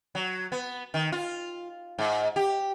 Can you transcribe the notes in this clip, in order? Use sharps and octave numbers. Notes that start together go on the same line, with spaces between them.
F#3
B3
D#3
F4
G#2
G4